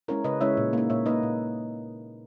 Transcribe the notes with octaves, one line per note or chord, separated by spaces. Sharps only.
G#3 C#4 E4 A#4 C#5
C#3 B4 D#5
G#3 C#4 E4 C#5 E5
A#2
A#3 D#4
A#2 C#5 E5
A#3 D#4 B4 D#5
A#2